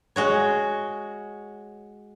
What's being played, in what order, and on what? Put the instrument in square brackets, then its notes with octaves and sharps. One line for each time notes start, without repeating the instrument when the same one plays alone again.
[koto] G#3 F#4 C#5